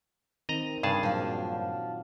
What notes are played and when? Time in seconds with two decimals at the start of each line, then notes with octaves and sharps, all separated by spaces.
0.49 D#3 C4 D#5 A#5
0.83 G2 C#3 G#4 A5
1.03 A#2 F3 F#3 D4